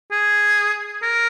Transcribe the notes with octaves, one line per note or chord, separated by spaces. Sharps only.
G#4
A#4